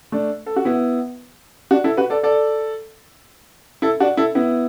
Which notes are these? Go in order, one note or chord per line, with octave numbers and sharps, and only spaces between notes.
A3 D4
A4
F#4
B3 E4
D4 F#4
E4 A4
F#4 B4
A4 D5
A4 D5
E4 A4
D4 F#4
E4 A4
B3 E4